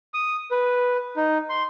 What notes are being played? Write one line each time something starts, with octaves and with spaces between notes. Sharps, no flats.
D#6
B4
D#4
C6